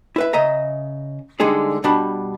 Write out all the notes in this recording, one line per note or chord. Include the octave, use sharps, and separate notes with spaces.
E4 B4 E5
C#3 D#5 E5 A#5
D3 G3 G#3 D#4 G#4 A4
B2 G3 D4 A5 B5